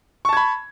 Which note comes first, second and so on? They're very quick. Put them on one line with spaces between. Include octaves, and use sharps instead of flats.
C#6 A5 G#6 B5